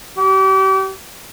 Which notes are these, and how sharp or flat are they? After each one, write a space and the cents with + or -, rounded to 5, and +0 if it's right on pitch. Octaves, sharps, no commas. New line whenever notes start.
G4 -35